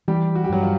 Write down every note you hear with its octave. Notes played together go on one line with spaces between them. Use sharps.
E3 G3 G4
F#4
G4
G2 F#3 F#4
F3 F4